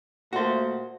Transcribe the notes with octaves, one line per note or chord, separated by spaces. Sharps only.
A#2 A3 F#4 C5